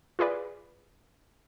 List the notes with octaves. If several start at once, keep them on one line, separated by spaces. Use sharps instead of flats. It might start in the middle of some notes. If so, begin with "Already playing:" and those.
F4 G#4 B4 D5